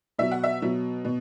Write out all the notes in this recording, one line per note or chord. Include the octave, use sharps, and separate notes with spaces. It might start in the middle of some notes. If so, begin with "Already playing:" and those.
B2 F#3 E5
F#5
E5
B2 F#3
B2